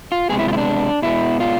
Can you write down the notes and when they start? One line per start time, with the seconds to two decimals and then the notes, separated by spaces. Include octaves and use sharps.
0.12 F4
0.29 C3 G#3 B3 G#4
0.39 E4
0.48 F4
0.53 E4
0.57 D4
1.02 B2 G#3 B3 E4
1.40 F4